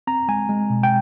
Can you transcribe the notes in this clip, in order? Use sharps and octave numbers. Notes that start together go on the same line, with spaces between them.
C4 A#5
G#3 G#5
G#3
B2
G5